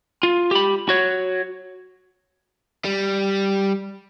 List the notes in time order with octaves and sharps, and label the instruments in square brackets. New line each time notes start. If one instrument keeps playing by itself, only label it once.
[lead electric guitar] F4
G4 B5
F#4 C#5
[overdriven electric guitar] G3